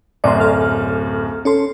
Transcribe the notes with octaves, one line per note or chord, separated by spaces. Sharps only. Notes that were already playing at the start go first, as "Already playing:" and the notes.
D1 F#2 D5 C6
A4 F6
C#4 A4 C6